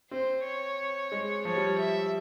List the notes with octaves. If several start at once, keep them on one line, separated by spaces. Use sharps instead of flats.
C4 C5
C#5
G#3
F3 C#5
G3
E5